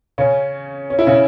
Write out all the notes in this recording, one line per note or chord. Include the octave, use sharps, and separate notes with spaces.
C#3 C#4
C#4
E4
C#3 C#4